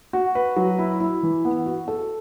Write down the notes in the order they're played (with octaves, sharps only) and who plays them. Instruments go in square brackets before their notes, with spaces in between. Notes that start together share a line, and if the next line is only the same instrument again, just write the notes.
[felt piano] F#4
B4
F#3
E4
E4
E3
B3
F#4
A4